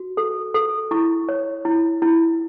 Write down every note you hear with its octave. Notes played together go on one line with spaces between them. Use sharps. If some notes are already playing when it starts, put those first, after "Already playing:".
Already playing: F#4
A4
A4
E4 C#6
C#5
E4
E4